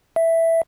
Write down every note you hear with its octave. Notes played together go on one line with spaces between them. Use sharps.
E5